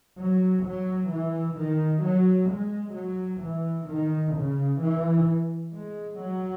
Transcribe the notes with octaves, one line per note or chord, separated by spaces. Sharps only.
F#3
F#3
E3
D#3
F#3
G#3
F#3
E3
D#3
C#3
E3
G#3
F#3